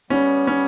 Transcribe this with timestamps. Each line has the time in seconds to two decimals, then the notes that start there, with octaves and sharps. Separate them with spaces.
0.10 G3 B3 C#4
0.47 C#4